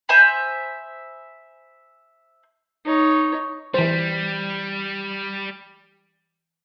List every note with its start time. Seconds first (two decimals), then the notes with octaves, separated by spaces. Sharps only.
0.09 C5 E5 G#5 B5
2.85 D#4 C#5
3.74 E3 G3 C5